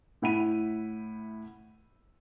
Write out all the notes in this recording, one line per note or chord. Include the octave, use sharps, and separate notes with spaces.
A2 E4 F#5 B5 D#7